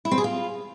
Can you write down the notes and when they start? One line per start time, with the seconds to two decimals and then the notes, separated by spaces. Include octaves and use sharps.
0.05 E4
0.11 C4
0.18 G#4
0.24 F4